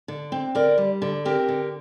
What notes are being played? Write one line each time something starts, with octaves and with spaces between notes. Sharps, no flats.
D3
C4
D3 A#4 D5
G3
D3
C4 G4 A#4
D3